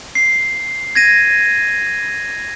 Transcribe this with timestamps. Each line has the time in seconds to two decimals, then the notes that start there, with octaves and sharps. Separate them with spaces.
0.15 C7
0.95 G#6 A#6 D#7